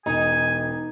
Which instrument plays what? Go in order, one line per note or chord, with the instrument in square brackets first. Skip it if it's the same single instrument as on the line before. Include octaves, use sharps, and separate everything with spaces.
[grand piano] E1 [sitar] D#4 [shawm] G#5